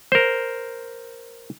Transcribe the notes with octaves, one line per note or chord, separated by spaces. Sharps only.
A#4 C5